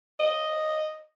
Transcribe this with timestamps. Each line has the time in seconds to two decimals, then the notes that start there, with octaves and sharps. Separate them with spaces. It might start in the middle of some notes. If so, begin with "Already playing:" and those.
0.19 D#5